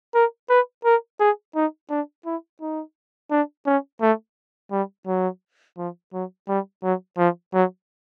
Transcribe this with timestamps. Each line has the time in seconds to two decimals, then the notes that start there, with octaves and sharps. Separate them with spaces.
0.14 A#4
0.49 B4
0.85 A#4
1.20 G#4
1.55 D#4
1.90 D4
2.26 E4
2.61 D#4
3.31 D4
3.66 C#4
4.02 A3
4.72 G3
5.07 F#3
5.78 F3
6.13 F#3
6.48 G3
6.83 F#3
7.18 F3
7.54 F#3